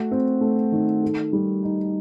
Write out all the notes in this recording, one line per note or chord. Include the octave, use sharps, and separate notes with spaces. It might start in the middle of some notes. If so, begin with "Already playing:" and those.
Already playing: A3 F#4
C4
A3
D#3
A4
G3
D#4